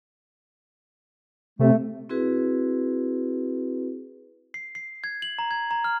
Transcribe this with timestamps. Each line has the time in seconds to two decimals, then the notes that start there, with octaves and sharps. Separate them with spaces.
1.59 C3 A3
2.09 C4 E4 F#4 G#4 B4
4.54 C7
4.75 C7
5.04 G#6
5.22 F#7
5.39 A#5
5.51 G#6
5.71 A#5
5.84 F6